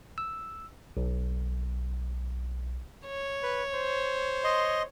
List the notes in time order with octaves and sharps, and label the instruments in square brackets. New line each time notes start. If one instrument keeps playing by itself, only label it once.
[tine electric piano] E6
B1
[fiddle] C#5
[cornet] B4
C5
[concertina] D#5 C6